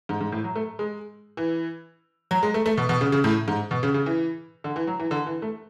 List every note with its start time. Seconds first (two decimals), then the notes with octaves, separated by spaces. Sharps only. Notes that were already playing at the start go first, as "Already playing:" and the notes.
0.09 G#2
0.21 G#2
0.32 A2
0.44 F#3
0.55 A3
0.79 G#3
1.37 E3
2.31 F#3
2.43 G#3
2.54 A3
2.66 A3
2.78 B2
2.89 B2
3.01 C#3
3.12 C#3
3.24 A2
3.48 G#2
3.71 B2
3.83 C#3
3.94 C#3
4.06 E3
4.64 D3
4.76 E3
4.87 F#3
5.00 E3
5.11 D3
5.26 E3
5.42 A3